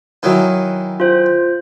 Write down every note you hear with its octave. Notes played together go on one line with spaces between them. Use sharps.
D#3 E3 F#3
F4 C5